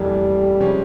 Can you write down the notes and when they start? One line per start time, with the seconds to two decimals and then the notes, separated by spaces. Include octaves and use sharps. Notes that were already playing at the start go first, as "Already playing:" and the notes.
Already playing: F1 F2 C3 E3 G3 A#3
0.60 C3 F3 G#3 C#4